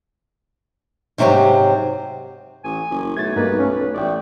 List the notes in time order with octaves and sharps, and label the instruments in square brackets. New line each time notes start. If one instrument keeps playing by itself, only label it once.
[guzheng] G#2 C3 F#3 C4 G4
[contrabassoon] A1 [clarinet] G#5
[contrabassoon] F#1
[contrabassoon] B1 [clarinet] A3 [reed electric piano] G#6 A6
[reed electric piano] G2 A#3 D#4 [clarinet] B4
[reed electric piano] A3 C#4 [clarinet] B4
[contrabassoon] A1 [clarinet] A3 [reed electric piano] D5 G5